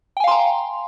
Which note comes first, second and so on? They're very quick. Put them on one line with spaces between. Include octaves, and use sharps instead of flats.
G5 G#5 F5 C6 A#5